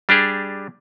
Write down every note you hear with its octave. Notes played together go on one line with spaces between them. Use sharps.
G3 D4 G4 G#4